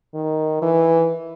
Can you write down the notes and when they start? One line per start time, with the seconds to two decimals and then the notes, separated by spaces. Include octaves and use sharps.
0.14 D#3
0.62 E3